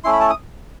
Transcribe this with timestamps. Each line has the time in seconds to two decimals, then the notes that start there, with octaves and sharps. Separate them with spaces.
0.04 A3 C#4 E4 C6
0.13 B5
0.21 A5
0.30 D#6